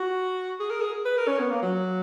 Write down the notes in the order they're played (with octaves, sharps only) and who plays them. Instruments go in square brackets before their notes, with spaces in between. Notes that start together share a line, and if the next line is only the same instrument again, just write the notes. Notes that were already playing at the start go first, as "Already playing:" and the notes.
Already playing: [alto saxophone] F#4
G#4
A#4
G#4
B4
A#4
C#4
B3
A#3
F#3